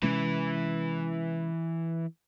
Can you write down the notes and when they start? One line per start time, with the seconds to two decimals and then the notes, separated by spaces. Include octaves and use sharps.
0.03 C3 E3 G#3 C#4 B4